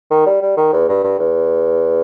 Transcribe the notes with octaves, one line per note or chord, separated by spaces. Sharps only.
D#3
G3
G3
D#3
E2
G2
G2
E2